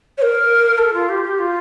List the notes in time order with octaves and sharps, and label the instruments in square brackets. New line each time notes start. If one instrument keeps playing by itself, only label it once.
[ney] C#5
A#4
A4
F4
G4
G4
F4